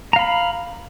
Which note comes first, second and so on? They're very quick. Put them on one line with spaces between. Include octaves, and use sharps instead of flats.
A#5 F5 B5